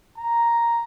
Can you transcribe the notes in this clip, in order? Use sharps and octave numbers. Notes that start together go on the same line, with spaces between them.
A#5